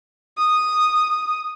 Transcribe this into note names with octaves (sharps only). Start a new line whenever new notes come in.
D#6